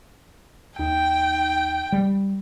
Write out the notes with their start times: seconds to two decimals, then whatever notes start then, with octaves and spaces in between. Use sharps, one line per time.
0.79 D#2 D#4 G5
1.92 G3